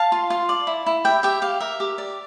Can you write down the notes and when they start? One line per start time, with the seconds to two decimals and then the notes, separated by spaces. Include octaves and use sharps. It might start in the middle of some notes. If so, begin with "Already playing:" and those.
Already playing: F5 A5
0.12 F4
0.30 F4
0.49 D5
0.67 E4
0.86 E4
1.04 G4 E5 G5
1.23 G4 E5 G5
1.42 G4 F5
1.60 A#4 E5
1.80 G4
1.98 D5